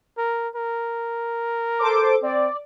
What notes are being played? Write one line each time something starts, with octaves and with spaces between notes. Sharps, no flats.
A#4
A#4
A4 C5 D6
C4 D5